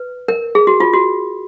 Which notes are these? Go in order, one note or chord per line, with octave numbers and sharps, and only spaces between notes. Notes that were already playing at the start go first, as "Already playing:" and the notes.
Already playing: B4
A#4
G#4
F#4
F4
F#4